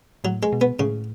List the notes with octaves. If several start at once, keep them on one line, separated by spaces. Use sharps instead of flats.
A2 F#3
G#3
B2
B3
A2 C#3